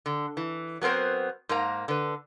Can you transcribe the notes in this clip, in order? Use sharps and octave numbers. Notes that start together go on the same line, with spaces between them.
D3
E3
F#3 B3 C4 A#4 C5
G#2 A#3 A#5
D3 B4